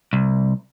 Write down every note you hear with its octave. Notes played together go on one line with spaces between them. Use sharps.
C2